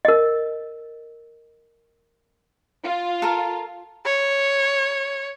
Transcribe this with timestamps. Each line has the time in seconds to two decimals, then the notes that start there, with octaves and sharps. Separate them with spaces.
0.05 A#4 D#5
2.84 F4
3.22 A4 A#4
4.05 C#5